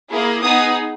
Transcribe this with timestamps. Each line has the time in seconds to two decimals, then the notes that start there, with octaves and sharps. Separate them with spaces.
0.11 A#3 E4 G#4
0.42 B3 D#4 G#4 D#6